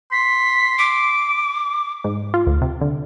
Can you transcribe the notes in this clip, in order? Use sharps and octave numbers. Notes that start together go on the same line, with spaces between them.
C6 B6
D6 D7
G#2
F4
D2
C3
D3